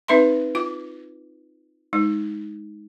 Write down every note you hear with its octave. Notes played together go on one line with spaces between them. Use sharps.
C4 D#4 B4 E5 B5 C6
F4 D6
G#3 D#4